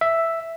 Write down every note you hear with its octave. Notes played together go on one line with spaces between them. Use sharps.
E5